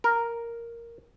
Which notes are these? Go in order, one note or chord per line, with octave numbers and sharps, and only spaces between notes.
A#4